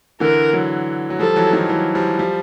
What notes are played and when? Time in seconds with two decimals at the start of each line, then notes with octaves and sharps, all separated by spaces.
0.20 D3 E3 A#4
0.53 E3 F#3
1.10 F#3
1.19 F3 G3 A4
1.36 E3 F#3
1.53 D#3 F3
1.69 E3 F#3
1.95 F3 G3
2.19 F3 G3